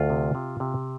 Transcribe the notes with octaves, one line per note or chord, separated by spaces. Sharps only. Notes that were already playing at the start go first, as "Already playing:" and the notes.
Already playing: D2 F4
C3
C3
C3